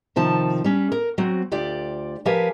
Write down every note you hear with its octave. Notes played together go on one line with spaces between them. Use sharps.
C3 D#3 F3 A5
G3 C#4
A#4
F#3 C4 F#4
D2 F4 G4 D5
F3 G4 A#4 B4 F5 G#5